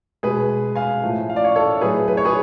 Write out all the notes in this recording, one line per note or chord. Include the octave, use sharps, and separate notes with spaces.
B2 G#3 G#4 B4
F5 G#5
A2 F3 A3
F5
D5
C#5 F5
A4 C#5
A2 F#3 A3 G#4 B4
B4
C#5
G#4 B4